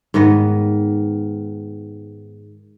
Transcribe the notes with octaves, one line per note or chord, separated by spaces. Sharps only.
G#2 D#3 B3 D#5